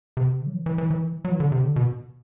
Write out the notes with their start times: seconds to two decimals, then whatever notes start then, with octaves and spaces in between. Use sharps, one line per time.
0.17 C3
0.41 D3
0.47 F#3
0.53 E3
0.66 E3
0.78 E3
0.91 E3
1.25 F#3
1.32 E3
1.40 D3
1.52 C3
1.64 D3
1.76 B2